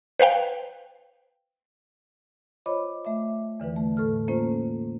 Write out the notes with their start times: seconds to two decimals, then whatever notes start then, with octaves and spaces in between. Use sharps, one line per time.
0.19 B4 C5 F5 G5
2.66 F4 C5 C#5 D#5 B5 D6
3.05 A3 E5 D6
3.60 E2 D3 E3 B4
3.76 A3
3.97 A2 A4 F6
4.28 A#3 C#4 F4 C5